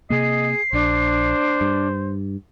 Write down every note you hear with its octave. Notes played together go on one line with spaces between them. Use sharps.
C3 A#3 G#4 D#5 C7
A#1 D4 C5
G2